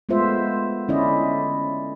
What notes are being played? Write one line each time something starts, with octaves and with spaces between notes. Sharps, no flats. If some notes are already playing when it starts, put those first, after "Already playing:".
G#3 A3 B3 F4 C5 E5
D3 C#4 E4 D5 D#5